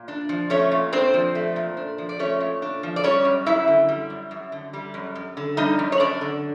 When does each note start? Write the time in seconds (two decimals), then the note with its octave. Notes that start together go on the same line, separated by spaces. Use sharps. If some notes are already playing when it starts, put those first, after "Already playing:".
Already playing: A#2
0.08 D4
0.29 F3
0.50 A3 C#4 C#5
0.72 A#2
0.93 C4 D4 C5
1.14 F3
1.35 A3
1.56 A#2
1.77 D4
1.98 F3
2.09 D5
2.19 A3 C#4 C#5
2.41 A#2
2.62 D4
2.83 F3
2.96 D5
3.03 G3 C#4 C#5
3.25 F#2
3.46 F#2 E4 E5
3.68 D3
3.89 G3
4.10 F#2
4.31 F#2
4.52 D3
4.73 G3
4.94 F#2
5.15 F#2
5.37 D3
5.57 G3 D#4 D#5
5.79 F#2
5.92 C#5
6.00 F#2 D4 D5
6.21 D3